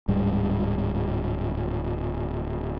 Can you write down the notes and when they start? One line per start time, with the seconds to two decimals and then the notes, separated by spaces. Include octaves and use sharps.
0.08 D1 G#2 G3